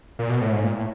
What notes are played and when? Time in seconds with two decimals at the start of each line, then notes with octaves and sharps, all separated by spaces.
0.19 A#2
0.30 B2
0.41 A2
0.52 G#2
0.64 A#2
0.76 A2